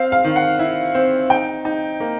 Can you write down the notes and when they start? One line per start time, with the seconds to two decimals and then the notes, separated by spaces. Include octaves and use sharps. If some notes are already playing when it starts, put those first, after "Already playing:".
Already playing: C4 F5
0.12 F5
0.24 D#3
0.36 F#5
0.59 E4
0.95 C4
1.30 D#4 G5
1.65 D#4
2.00 A#3